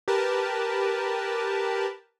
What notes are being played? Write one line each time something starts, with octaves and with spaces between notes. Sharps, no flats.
G4 A#4 B4 A5